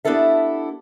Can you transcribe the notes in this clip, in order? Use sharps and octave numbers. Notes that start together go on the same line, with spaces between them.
B3 D4 E4 G4 A4 E5